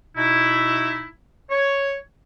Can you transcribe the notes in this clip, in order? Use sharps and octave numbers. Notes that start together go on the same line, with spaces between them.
B2 D#4 E4
C#5